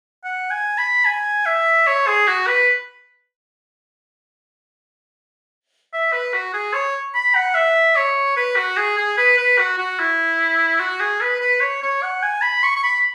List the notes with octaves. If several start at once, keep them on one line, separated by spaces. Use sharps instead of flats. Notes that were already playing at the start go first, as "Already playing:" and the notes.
F#5
G#5
B5
G#5
E5
C#5
G#4
F#4
B4
E5
B4
F#4
G#4
C#5
B5
F#5
E5
C#5
B4
F#4
G#4
G#4
B4
B4
F#4
F#4
E4
F#4
G#4
B4
B4
C#5
C#5
F#5
G#5
B5
C#6
C#6
B5